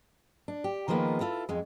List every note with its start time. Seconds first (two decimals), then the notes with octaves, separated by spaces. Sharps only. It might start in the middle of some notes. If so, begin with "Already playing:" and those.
0.48 D4
0.64 G4
0.88 D#3 F3 G#3 A#3 B3
1.20 E4 F4 A4
1.49 F2 G#3